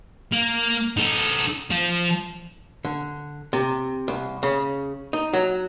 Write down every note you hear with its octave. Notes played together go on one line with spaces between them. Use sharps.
A#3
D#4 A4
F3
D3
C3
C2
C#3
D#4
F#3